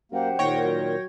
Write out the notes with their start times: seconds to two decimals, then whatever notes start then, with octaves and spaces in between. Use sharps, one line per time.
0.12 F#2 A#3 G4 C5 F#5
0.39 D#2 A#2 D#3 C#5 G5 A#6
0.64 F#3
0.86 G#6